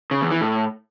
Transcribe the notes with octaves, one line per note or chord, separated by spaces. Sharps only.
C#3
E2
E3
A2